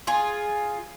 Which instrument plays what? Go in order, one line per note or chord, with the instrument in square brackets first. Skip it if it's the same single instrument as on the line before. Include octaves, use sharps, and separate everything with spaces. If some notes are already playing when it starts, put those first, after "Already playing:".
[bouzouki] F4 G#4